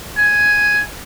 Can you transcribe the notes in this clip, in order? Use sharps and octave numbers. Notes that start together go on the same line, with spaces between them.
G#5